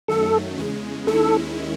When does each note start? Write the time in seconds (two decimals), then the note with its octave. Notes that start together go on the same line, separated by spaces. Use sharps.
0.08 F#2 D#3 F#3 A3 A4
0.58 E2 C#3 G#3
1.07 D#2 D#3 G#3 C#4 E4 A4